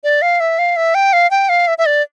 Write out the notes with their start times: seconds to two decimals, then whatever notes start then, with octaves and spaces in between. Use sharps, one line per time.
0.04 D5
0.22 F5
0.40 E5
0.59 F5
0.76 E5
0.95 G5
1.13 F5
1.31 G5
1.49 F5
1.67 E5
1.78 E5
1.86 D5